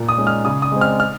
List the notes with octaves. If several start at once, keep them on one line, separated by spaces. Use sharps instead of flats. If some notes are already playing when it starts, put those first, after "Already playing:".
Already playing: A#2
D#6
G#3 C#4
F6
C#3 D#6
D#6
G#3 C4
F6
F6